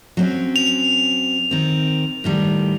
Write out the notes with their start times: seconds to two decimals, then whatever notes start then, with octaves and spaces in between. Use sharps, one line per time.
0.17 F#3 C4 C#4
0.56 F7
1.51 D#3 C4
2.24 A2 D#3 G3